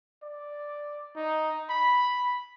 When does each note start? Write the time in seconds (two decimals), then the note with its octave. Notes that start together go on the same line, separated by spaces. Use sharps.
0.23 D5
1.16 D#4
1.70 B5